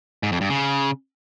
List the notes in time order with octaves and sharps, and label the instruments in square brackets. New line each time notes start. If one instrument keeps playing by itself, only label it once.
[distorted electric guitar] G#2
F2
G2
C#3